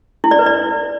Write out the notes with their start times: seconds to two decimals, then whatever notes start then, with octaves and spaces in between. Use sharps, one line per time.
0.24 E4
0.31 D5
0.39 B4
0.46 D5